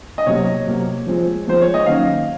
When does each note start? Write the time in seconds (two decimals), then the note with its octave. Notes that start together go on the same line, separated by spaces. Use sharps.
0.18 D#5
0.26 C3 F#3 A#3 C#5
0.67 C3 F#3 A#3
1.07 F3 G#3 C4
1.47 F3 G#3 C4 C5
1.62 C#5
1.74 D#5
1.86 D#3 F#3 A#3 C#4 F5